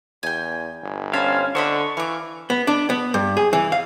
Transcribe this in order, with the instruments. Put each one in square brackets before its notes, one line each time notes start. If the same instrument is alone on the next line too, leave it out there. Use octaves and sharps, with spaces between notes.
[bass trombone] E2 [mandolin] G5 G#5
[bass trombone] G1
[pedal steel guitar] C#4 C5 F5 [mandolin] G#5 A5 B5
[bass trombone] D3 [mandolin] C5 D#5 B5 [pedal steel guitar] C#6
[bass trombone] E3 [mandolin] F5 D6
[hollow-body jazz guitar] B3
D4
B3
G2
G#4
E3
F5